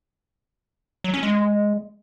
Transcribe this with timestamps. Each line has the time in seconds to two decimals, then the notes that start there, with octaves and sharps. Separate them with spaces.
1.04 F#3
1.14 C#4
1.23 G#3